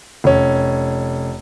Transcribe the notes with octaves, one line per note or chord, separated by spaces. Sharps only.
F1 C#4